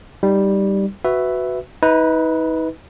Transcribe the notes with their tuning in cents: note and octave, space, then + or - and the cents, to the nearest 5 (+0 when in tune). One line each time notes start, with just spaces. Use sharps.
G3 +0 D#4 +0
F#4 +0 B4 +10 E5 +0
D#4 +40 B4 +0